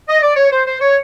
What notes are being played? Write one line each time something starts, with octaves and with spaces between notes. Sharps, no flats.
D#5
D5
C#5
C5
C5
C#5